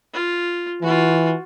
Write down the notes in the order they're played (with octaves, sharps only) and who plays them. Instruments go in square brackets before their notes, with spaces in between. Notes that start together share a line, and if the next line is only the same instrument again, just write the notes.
[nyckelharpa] F4
[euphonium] E3 [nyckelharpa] F4 F#4